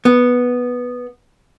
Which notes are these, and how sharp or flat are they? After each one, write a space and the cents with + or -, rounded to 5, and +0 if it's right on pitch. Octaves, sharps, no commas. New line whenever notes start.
B3 -5